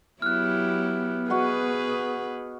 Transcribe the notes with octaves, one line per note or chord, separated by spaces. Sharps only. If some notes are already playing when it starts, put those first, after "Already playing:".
F#3 B3 E4 G4 F6 F#6
F#4 G#4 B4 D#5 F#5